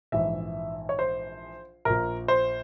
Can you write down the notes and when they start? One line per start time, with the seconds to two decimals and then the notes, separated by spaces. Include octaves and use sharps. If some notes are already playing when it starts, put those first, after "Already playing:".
0.12 A#1 G#2 E3 E5
0.89 C#5
0.99 C5
1.85 A#1 A#2 A#4
2.28 C5